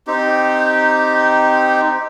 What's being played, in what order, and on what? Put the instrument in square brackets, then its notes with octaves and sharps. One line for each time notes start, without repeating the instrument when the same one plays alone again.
[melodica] C4 D#4 G4